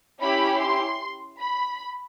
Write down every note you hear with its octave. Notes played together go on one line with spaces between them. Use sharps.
C#4 E4 G4 B5
C6
B5